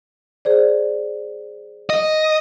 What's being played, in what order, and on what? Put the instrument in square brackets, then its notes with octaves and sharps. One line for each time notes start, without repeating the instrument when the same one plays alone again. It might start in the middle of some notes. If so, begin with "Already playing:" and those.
[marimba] G#4 C5 D5
[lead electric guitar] D#5